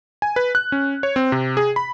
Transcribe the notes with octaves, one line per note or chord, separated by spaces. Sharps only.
G#5
B4
F#6
C#4
C#5
C4
C3
G#4
B5